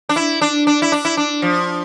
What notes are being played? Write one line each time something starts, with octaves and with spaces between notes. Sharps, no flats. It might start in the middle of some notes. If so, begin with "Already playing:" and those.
D4
E4
D4
D4
E4
D4
E4
D4
F3